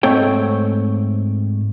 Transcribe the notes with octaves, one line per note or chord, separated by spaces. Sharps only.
G#2 A3 C4 C#5 G5